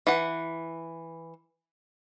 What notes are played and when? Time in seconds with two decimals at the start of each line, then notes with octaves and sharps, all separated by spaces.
0.07 E3 F#5